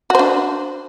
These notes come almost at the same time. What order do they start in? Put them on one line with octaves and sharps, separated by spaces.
F#4 C5 D4